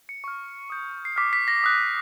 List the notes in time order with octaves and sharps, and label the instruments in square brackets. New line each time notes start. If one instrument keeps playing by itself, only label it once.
[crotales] C#7
C#6 F6
D#6 G6
C7
D6 F6 B6
B6
A#6
D#6 F#6